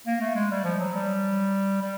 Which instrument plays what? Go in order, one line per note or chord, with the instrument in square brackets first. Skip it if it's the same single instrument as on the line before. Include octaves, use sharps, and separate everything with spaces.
[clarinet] A#3
A3
G#3
G3
F3
F#3
G3
G3